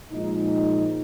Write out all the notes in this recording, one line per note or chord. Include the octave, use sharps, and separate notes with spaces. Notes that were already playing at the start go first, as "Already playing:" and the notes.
A#2 F3 G#3 D#4